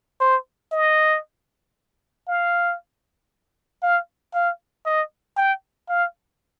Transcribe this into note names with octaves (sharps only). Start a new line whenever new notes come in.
C5
D#5
F5
F5
F5
D#5
G5
F5